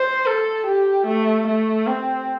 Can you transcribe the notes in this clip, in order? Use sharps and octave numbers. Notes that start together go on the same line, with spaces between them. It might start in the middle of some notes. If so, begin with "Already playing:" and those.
Already playing: C5
A4
G4
A3
A3
C4